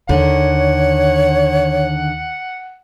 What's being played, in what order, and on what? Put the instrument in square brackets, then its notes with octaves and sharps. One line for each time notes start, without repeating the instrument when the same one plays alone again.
[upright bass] D#2 [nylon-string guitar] D3 D#3 [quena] C#5 [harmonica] F#5